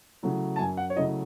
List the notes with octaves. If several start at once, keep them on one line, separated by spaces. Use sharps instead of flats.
C#3 F#3 A3 E4
A5
F#2 G#5
F#5
C#5
C#3 F#3 A3 E4 D#5